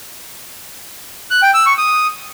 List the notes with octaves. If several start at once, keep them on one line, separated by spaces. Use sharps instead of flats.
F#6
G5
E6
C#6
D#6